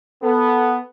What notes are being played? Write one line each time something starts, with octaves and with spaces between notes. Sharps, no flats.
B3 A4